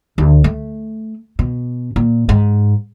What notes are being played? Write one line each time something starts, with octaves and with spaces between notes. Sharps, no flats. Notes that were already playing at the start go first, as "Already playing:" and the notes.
D2
A3
B2
A#2
G#2